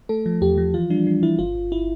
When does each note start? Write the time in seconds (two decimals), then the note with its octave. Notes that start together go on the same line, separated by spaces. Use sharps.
0.09 A3 A4
0.26 F3
0.41 E2 G4
0.58 F3
0.74 E3 F4
0.90 G3 D4
1.07 G3
1.23 E3 E4
1.39 G1 F4
1.55 G1
1.72 E4